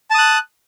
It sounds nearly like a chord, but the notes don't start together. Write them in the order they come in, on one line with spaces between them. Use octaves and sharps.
A5 D#6 F#6